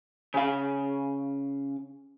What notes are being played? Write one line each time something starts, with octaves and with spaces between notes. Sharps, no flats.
C#3 F5